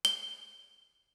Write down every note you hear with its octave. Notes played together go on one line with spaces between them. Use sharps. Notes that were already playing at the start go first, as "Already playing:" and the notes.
G7